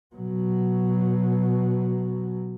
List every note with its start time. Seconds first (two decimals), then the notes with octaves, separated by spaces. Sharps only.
0.15 B2 F#3